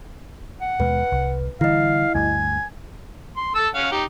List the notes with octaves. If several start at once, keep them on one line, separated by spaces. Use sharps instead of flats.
F#5
D#2 B2 G#3 B4
C2
D3 E3 G3 E4 D#5 F5
D2 G2 G#5
C6
A4 A5 E6
C#4 F5 F#5
D#4 G4